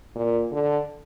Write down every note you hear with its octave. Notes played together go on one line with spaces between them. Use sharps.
A#2
D3